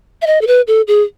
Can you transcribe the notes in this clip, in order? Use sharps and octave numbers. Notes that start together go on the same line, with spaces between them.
E5
D#5
A4
B4
A4
G#4